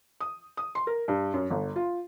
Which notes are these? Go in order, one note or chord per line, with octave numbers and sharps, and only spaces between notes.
D#6
D#6
C6
A#4
G2
F#2
G1
F4